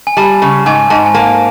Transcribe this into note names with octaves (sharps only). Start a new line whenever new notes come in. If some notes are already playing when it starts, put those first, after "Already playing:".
G#5
G3 A5
C#3
G#2 G#5
G#2 A5
G#5
A#3 A5